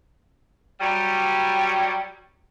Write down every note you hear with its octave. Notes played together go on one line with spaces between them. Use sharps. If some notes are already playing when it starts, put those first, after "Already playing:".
F#3 G3